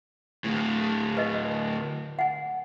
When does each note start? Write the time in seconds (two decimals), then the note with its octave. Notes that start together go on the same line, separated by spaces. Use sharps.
0.44 D2 A2
1.17 B4 D#5
2.19 F#5 G#5